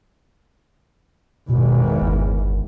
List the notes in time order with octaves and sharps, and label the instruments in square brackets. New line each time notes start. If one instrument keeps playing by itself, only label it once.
[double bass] G#1 E2 [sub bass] B2
[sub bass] G1